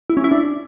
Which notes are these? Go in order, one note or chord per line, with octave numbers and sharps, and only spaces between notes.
E4
C#4
E4
D4